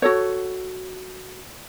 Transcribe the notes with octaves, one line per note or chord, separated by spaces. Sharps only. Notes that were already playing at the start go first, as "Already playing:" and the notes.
F#4 A4 C#5